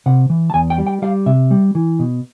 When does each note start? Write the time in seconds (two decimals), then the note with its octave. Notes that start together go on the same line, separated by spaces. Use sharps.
0.06 C3 F#5
0.30 E3
0.50 A5
0.54 E2 G#5
0.70 G5
0.78 G3
0.87 G5
1.02 G3 F5
1.26 C3 E5
1.51 G3
1.75 E3
1.99 B2